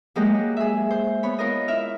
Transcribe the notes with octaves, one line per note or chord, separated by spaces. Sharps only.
F#3 G#3 A#3 G4 D#5 F#5
G#4 E5
C5
B3 C#5 B5
F4 A#4 D#5
E4 E5 F6